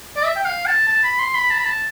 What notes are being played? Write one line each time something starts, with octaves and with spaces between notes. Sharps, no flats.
D5
E5
G5
F5
A5
A5
B5
C6
B5
A5
B5
A5